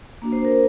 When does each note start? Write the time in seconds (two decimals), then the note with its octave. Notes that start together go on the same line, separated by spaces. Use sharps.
0.22 A#3 D4 F#4
0.32 C5
0.45 A#4